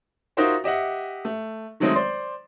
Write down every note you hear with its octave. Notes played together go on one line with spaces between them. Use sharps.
D#4 F4 F#4 A#4 C5 E5
G4 D#5 E5 F#5
A3
D#3 F#3 G#3 A3 C4 D#4
C5 D5 C6